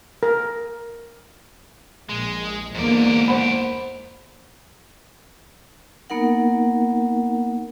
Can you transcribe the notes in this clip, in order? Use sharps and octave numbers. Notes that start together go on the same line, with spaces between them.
A#4
A#1 G#3
E2 G#2 D3 A#3 D5
C5 F#5 B5
A#3 B3 D#4 A#4 F#5